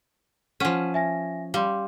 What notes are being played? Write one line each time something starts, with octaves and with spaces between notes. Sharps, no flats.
F3 C#4 F#5 B6 D#7
E5 G#5 A#6
G3 F5 C6